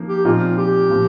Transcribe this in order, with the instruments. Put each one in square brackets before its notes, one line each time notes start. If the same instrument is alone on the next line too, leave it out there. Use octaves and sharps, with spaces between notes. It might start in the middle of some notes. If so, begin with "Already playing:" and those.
Already playing: [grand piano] F3 A#3 D#4
[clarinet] G4
[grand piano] A#2 F3 C4 D#4 [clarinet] F4
[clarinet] G4
[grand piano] A#2 F3 C4